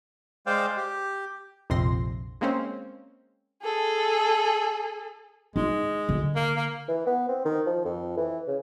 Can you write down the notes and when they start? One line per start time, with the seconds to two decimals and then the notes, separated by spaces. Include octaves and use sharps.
0.47 G#3 C5 D5 F5 G5
0.77 G4
1.70 A#1 F2 C3 C4 C6 A#6
2.41 G#3 A#3 C4 C#4 C5
3.63 G#4 A4
5.56 G#3 D#4
6.09 D3
6.35 A#3
6.56 A#3
6.88 E3
7.06 B3
7.28 C4
7.45 D#3
7.66 F3
7.85 F2
8.17 E3
8.48 C#3